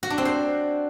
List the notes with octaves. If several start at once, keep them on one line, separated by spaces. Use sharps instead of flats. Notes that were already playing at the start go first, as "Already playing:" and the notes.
F#4
D4
C4
C5